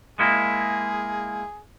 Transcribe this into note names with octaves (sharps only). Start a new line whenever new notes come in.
G#3 A#3 E4 G#4